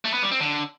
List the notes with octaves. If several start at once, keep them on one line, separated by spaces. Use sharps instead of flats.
A3
B3
G3
C4
D3